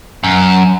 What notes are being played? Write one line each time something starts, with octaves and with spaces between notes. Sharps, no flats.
F#2